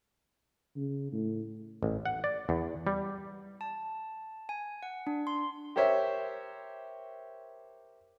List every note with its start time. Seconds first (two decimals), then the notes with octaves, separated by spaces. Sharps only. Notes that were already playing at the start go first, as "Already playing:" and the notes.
0.76 C#3
1.12 A2
1.83 A1
2.05 F#5
2.24 D5
2.49 E2
2.87 G3
3.61 A5
4.49 G#5
4.83 F#5
5.07 D4
5.27 C6
5.76 G4 A#4 C5 C#5 E5